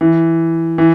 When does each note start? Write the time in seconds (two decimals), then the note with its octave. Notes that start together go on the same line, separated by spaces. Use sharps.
0.01 E3
0.78 E3